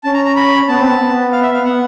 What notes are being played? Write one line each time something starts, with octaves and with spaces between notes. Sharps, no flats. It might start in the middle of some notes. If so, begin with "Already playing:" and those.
C#4 A5
A#5
A#5
B5
B3 A5
C4
B3
B3
F5
E5
F5
B3 F#5